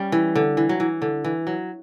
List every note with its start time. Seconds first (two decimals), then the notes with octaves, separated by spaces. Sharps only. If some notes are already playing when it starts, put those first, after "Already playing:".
Already playing: G3 C#4
0.12 E3
0.35 D3
0.57 E3
0.69 F#3
0.80 E3
1.02 D3
1.24 E3
1.47 F#3